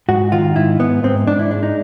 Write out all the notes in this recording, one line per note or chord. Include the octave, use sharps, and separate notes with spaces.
G#2 F#4
D#3 F4
G#2 E4
G#2 B3
G#2 C4
G#2 D4
E4
G#3 D4
D#4